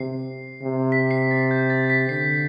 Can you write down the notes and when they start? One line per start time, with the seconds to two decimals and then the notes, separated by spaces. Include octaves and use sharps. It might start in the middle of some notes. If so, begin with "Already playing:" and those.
Already playing: C3 C7
0.63 C3
0.92 B6
1.11 C7
1.31 A6
1.51 G6
1.70 A6
1.90 B6
2.09 D3 C7